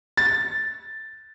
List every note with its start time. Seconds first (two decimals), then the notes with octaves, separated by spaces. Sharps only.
0.17 A6